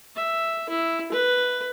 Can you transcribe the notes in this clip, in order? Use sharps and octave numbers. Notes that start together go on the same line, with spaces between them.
E5
E4
B4